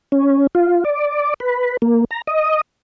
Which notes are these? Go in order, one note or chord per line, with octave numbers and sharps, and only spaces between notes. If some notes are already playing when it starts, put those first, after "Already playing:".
C#4
F4
D5
B4
A#3
A#5
D#5